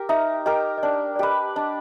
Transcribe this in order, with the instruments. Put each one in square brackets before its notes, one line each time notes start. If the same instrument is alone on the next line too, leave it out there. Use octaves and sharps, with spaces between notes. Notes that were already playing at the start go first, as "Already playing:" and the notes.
Already playing: [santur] G4 A#4
[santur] D#4 [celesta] E5
[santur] G4 A#4 [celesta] D#5
[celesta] D#5
[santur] D4 [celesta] D5
[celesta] D5
[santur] G4 B4 [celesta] D#5
[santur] D4 [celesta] D#5